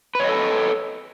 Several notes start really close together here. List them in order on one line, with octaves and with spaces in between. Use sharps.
B4 C#5 D#5 A4